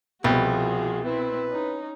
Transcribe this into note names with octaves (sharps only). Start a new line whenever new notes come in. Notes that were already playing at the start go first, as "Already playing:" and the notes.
C2 B2 F3 F#4 G#4
C4 E4 B4
C#4 D#4